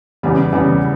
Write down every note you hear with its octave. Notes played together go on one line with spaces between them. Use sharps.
E2 C#3 G3 B3
E2 C#3 G3 B3